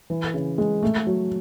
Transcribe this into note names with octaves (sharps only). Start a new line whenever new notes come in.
E3
C#3
G#3
A3
F#3